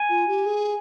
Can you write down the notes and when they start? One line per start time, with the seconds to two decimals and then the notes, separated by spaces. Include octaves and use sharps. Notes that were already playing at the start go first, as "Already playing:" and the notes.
Already playing: G#5
0.09 F4
0.28 G4
0.46 G#4